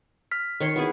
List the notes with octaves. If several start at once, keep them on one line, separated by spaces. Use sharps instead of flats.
F6 B6
D#3 C#5 C6
B3 E4 G#4